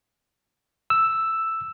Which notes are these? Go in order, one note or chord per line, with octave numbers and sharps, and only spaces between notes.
E6